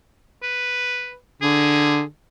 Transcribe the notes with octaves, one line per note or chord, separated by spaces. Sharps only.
B4
D3 G#4